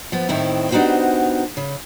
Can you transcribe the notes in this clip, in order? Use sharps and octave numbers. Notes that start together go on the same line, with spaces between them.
F3 B3
A2 D#3 C4 E4
B3 D4 D#4 F#4 G4 C5
C#3